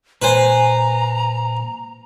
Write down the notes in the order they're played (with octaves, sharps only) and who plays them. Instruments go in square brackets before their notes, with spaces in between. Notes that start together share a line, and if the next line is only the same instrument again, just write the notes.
[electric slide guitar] A#2 G#5 [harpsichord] B4 C5 [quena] A#5